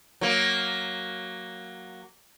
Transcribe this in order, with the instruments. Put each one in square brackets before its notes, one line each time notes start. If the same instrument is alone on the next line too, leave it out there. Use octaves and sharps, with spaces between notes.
[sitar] F#3 A#3